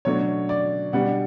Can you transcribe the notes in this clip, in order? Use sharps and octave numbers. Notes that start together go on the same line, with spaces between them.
B2 F#3 A3 D4 C#5
D5
B2 G3 D4 F#5